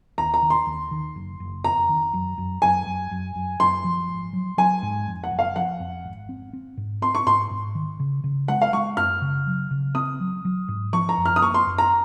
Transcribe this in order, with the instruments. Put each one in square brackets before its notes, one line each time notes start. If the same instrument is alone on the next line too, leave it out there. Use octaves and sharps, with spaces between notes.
[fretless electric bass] D#2 [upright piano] A#5
[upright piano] A#5
[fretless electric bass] D#3
[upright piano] C6
[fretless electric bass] D#2
D#3
F#1
F#1
[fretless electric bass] F2 [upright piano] A#5
[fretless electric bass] D#3
F#2
F#2
[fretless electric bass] F#2 [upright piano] G#5
[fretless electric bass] F#2
F#2
F#2
[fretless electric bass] F#2 [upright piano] C6
[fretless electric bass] F3
G#1
F#3
[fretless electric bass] F#3 [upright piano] G#5
[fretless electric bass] G#2
F2
[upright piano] F#5
[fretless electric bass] F#1
[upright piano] F5
[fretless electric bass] F3 [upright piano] F#5
[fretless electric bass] F2
G#1
C4
C4
G#2
[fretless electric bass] C4 [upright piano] C6
[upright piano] C#6
[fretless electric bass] G#2 [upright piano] C6
[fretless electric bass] G#2
D#3
C#3
C#3
[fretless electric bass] G#3 [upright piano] F#5
[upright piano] F5
[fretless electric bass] G#3 [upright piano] C#6
[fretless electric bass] F#2 [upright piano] F6
[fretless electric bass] C#3
F#3
C#3
[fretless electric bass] C4 [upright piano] D#6
[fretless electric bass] F#3
F#3
G#2
[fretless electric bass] F3 [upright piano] C#6
[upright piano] A#5
[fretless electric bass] F#2
[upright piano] F6
D#6
[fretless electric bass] A#3 [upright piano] C#6
[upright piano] C6
[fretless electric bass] F#2
[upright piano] A#5